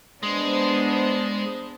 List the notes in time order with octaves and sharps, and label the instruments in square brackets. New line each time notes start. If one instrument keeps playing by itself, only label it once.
[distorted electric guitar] G#3 [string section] B3 D4 C5